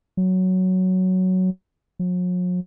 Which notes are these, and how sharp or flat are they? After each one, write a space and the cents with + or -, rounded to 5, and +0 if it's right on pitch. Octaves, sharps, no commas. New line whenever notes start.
F#3 +5
F#3 -45